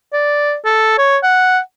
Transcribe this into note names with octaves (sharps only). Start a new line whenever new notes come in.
D5
A4
C#5
F#5